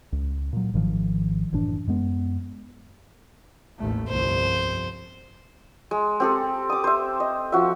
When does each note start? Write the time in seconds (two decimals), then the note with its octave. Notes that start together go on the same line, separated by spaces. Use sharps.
0.12 C#2
0.53 A#2 F#3
0.73 G#1 G#2 D#3 F3
1.53 F#1 A2 E3 D4
1.87 F#2 G#3 B3
3.78 A1 D#2 A3
4.08 G1 C2 F2 C5
5.91 G#3
6.20 C4 G4 A4
6.70 D6 D#6
6.84 C5 E5
7.20 D#5
7.52 F3 F#4 E5